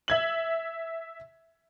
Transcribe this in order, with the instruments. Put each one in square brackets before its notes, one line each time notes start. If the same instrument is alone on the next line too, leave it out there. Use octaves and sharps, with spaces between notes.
[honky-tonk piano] E5 G#6 F#7